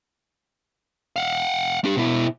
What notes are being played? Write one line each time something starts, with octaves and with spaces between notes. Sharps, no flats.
F5 F#5
D4 G4
B2 E4